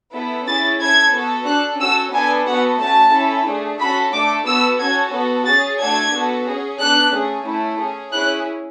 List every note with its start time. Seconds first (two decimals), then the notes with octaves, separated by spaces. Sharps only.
0.14 B3 E4 A4
0.47 C#4 E4 G#4 A6
0.80 C#4 E4 A4 G#6
1.13 B3 F#4 A4
1.47 D4 A4 F#6
1.80 C#4 F#4 A4 E6
2.13 B3 D4 A4 G#5
2.47 B3 F#4 A4 F#5
2.80 A3 C#4 F#4 A5
3.13 C#4 E4 A4
3.47 A3 D4 G#4
3.79 C#4 F#4 A4 B5
4.13 A3 D4 A4 D6
4.46 B3 F#4 A4 E6
4.79 C#4 F#4 A4 G#6
5.13 B3 F#4 A4
5.46 C#4 G#4 A6
5.79 A3 D4 F#4 A4 G#6
6.13 B3 F#4 A4
6.46 C#4 G#4
6.79 B3 D4 A4 F#6
7.12 A3 C#4 G#4
7.46 A3 C#4 E4
7.79 C#4 G#4
8.12 C#4 E4 G#4 F#6